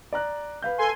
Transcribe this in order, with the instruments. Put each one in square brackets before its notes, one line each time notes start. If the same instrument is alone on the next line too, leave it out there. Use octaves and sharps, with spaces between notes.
[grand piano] D5 A#5 F#6
B4 F5 G6
[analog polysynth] A4 G#5 C6